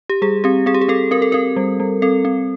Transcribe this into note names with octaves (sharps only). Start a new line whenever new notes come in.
G4
G3 G#4
C4 G4
C4 G#4
G4
G#4
C4 A4
C4 A#4
A4
C4 A#4
G3
G3
C4 A4
C4